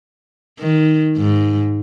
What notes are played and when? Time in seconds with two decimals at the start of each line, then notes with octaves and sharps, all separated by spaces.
0.59 D#3
1.17 G#2